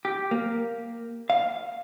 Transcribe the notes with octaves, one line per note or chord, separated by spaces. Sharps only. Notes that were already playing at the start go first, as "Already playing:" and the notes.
G4
A#3
F5